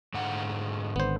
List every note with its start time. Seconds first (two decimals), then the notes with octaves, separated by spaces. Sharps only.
0.14 G#2 D3 F#5
0.96 G#1 D3 B3 C5